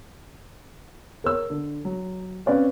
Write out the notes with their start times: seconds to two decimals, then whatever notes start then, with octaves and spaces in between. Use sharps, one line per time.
1.24 A#4 C#5 E6
1.50 D3
1.85 F#3
2.46 C4 C#4 B4 D5 F5